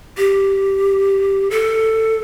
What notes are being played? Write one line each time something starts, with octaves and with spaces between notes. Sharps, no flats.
G4
A4